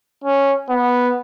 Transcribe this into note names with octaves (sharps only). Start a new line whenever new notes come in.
C#4
B3